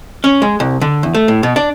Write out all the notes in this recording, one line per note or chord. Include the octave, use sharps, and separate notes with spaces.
C#4
G#3
C2
D3
E2
A3
A2
B2
D4